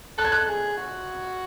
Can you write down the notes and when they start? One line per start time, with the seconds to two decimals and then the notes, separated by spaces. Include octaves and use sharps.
0.18 A4 F#6
0.25 G#6
0.32 F#6
0.48 G#4
0.77 F#4